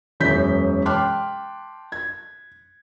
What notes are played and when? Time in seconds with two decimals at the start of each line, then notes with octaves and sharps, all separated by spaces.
0.20 E1 F#2 E4 G6 B6
0.86 G5 A5 C6 D6 F6 F#6
1.92 G#6